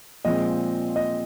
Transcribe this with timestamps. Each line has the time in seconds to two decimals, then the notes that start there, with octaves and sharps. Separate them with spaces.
0.25 A#2 F3 G#3 C4 D#5
0.96 D#5